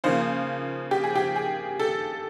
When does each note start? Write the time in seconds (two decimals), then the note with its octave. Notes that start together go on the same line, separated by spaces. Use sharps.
0.04 C#3 F3 A#3 C5
0.91 G4
1.04 G#4
1.15 G4
1.36 G#4
1.79 A4